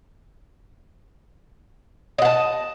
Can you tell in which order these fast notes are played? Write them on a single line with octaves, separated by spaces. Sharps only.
D#5 F#5 A5